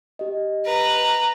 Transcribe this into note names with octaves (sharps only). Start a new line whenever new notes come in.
G4 D#5
B4 A#5